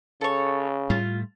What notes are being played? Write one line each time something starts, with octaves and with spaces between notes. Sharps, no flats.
C#3 A4 C#5
A2 G3 A3 F4